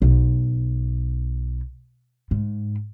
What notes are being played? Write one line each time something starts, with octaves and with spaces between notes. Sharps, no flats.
B1
G#2